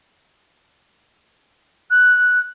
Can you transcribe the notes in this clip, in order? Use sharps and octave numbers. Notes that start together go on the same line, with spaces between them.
F#6